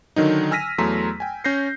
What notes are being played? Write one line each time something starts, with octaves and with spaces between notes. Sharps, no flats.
D3 D#3 F#3 D#4
G#5 E6 F6 A#6 B6 D#7
E2 F#3 A3 A#5 C6 B6
G5 G#5
C#4 G6 A#6 C7